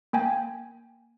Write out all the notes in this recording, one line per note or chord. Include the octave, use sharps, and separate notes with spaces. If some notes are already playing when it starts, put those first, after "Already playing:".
A#3 G5 G#5